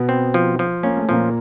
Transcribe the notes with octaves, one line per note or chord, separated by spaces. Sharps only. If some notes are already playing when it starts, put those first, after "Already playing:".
Already playing: B2 B3
C4
F3
F3
A#3 C#4
A3
A#2 F3 A#3